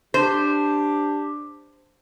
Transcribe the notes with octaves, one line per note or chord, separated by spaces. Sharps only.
D4 G4 C5